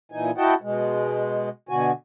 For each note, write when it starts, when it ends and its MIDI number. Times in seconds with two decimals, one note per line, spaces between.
0.12 0.31 46
0.12 0.31 52
0.12 0.31 63
0.12 0.31 80
0.38 0.54 64
0.38 0.54 66
0.38 0.54 75
0.38 0.54 78
0.38 0.54 79
0.38 0.54 81
0.62 1.49 47
0.62 1.49 56
1.69 1.91 47
1.69 1.91 50
1.69 1.91 66
1.69 1.91 80